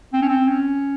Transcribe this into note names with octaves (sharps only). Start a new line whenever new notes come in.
C4
C#4
C4
C#4